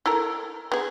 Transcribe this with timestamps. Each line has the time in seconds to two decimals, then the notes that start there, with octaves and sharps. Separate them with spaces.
0.06 E4 A4 A#4
0.72 B3 G#4